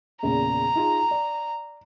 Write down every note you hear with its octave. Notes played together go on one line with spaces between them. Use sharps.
E2 A#2 C#3 A#5
D#4 F4 G#4
D5